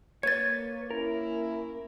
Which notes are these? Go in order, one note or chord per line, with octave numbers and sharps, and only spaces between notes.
A#3 B4 C#5 G#6 A6
C#4 E4 A#4